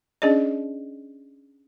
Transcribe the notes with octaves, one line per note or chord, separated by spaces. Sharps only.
C#4 D4 G#4 D5 D#5